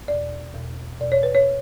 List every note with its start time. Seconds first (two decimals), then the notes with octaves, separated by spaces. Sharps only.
0.08 E2 B2 D5
0.54 E2 B2
1.00 E2 B2 D5
1.12 C#5
1.23 B4
1.35 C#5